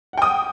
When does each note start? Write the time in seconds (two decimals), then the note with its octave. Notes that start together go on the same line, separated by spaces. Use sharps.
0.13 F#5
0.18 G5
0.22 D#6